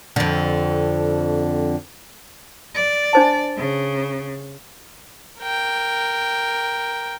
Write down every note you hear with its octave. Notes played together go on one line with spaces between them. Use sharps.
F2 D3
D5
D4 C5 A5
C#3
A#4 G5